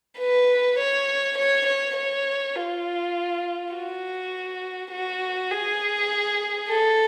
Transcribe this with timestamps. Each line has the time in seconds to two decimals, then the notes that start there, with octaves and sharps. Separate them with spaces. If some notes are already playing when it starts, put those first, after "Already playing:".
0.19 B4
0.79 C#5
1.37 C#5
1.66 C#5
1.96 C#5
2.56 F4
3.74 F#4
4.92 F#4
5.50 G#4
6.69 A4